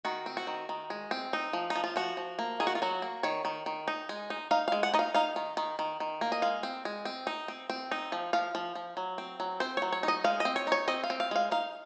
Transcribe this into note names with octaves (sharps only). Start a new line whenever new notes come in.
D#3 F#4
C4
F#4
D#3
D#3
G#3
C4
D#4
F3
D#4
F3
F4
F3 F#4
F3
A#3
D#3 G#4
F#4
F4
F#3 F#4
A#3
D#3 C#5
D#3
D#3
D#4
G#3
D#4
D#4 F5
G#3 F5
F#5
D#4 D#5
F5
D#4 F5
D#3
D#3
D#3
D#3
A#3
D#5
G#3 F5
C4
G#3
C4
D#4
C4
C4
D#4
F3
F3 F5
F3
F3
F#3
C4
F#3
C4 C5
F#3 C#5
C#5
D#4
D#5
G#3 F5
C4 D#5
C#5
D#4 C#5
C4 D#5
F5
C4
F5
G#3 F5
D#4 F5